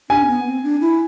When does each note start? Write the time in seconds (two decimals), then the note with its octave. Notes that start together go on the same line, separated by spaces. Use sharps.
0.09 D4 G#5
0.23 C4
0.28 B3
0.46 C4
0.64 D4
0.81 E4